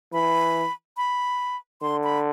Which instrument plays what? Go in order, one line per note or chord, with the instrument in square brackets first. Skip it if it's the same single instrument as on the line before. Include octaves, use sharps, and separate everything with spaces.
[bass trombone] E3 [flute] B5
[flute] B5
[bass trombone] D3 [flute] C6
[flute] B5